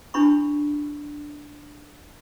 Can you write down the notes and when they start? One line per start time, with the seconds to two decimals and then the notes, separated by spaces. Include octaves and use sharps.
0.14 D4 E4 B5 C#6